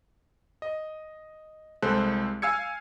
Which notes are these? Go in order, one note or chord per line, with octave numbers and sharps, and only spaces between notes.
D#5
C2 G#3 A4 C5 F#6
F5 G#5 E6 G#6 C#7